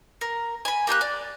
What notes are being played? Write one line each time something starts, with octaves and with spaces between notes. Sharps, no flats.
A#4
G#5 B5
A#3 G4 G#5 F#6
D5